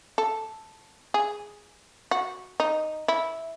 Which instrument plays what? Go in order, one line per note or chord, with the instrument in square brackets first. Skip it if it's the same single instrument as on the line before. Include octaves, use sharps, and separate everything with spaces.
[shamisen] A4
G#4
F#4
D#4
E4